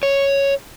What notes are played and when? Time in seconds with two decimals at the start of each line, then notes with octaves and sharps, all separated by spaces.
0.03 C#5